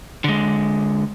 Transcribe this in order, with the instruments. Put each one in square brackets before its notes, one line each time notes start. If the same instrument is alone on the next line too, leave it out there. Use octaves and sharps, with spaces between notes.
[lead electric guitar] D3 G#3